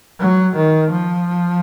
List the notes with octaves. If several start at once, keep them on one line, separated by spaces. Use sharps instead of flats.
F#3
D#3
F3